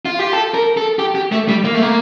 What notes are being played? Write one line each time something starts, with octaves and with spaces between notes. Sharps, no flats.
F4
G4
A4
A#4
A4
G4
G4
A3
G3
A#3
A3
A#3